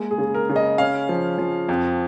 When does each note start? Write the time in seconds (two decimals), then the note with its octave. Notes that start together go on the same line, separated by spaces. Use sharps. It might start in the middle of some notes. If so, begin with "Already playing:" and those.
Already playing: G#3 A#3
0.11 G#4
0.18 C#3
0.34 A#4
0.49 C#3
0.56 D#5
0.78 C#4 F5
1.09 F3
1.38 F3
1.69 F2